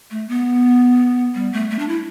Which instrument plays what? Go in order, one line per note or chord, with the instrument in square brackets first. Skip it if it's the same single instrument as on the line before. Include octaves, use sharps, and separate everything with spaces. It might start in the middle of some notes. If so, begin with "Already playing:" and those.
[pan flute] A3
B3
G3
A3
A3
D4
E4